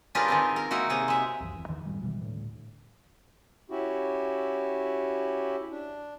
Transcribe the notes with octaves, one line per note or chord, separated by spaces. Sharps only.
D4 F4 G4 G#4 A#4 B4
D#3 G#3 C4
A#4
A#3 D#4 E4 F#4
C3 A#3 G#4
G#3 E5
C2 F#2 E3
F#1 E2
E2 D#3 E3
G#1 F2 A2 G3
B2 D#3 E3 G3
D2 A2
C#4 E4 F#4 G4
D4